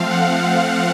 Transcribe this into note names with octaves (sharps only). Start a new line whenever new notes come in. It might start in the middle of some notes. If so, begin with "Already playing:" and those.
Already playing: F3 A3 C4 F5
F#5